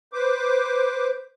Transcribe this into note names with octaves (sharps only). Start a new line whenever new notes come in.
B4 C5 D6